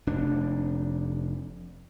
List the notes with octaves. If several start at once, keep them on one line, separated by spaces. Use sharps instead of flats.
F1 D4